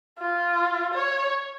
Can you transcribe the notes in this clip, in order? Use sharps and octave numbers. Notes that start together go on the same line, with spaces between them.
F4
C#5